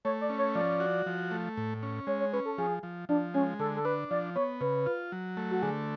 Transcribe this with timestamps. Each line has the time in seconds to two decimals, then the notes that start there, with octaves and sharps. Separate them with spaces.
0.05 A3 C#5
0.21 D5
0.30 C#4
0.39 C#5
0.55 F3 D5
0.80 F#4
1.06 F3
1.31 A3
1.57 A2
1.83 C#4
2.07 G#3 C#5
2.20 C#5
2.33 C#4 B4
2.45 A4
2.58 F3 G#4
2.83 F3
3.09 F3 D4
3.34 G#3 C#4
3.59 D3 A4
3.77 A4
3.85 D4 B4
4.10 F3 D5
4.35 B3 C#5
4.61 C#3 B4
4.86 F4
5.12 F#3
5.37 A3
5.51 F#4
5.62 D3 G#4